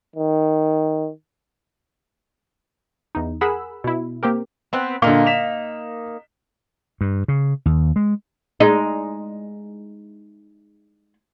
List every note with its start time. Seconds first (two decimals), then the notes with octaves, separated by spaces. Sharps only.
0.16 D#3
3.15 E2 D#4
3.41 G#4 A#4 F#5 B5 E6
3.84 B2 E4
4.23 A#3 C4 G4 A#4
4.73 B3 C4 B4
5.02 A#2 D3 A#3 D#4
5.26 B6 E7 F7
7.01 G2
7.28 C#3
7.66 D#2
7.96 G#3
8.60 G#3 D#4